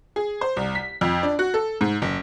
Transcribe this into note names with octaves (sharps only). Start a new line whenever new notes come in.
G#4
C5
C2
B6
F2
D4
F#4
A4
G#2
F#1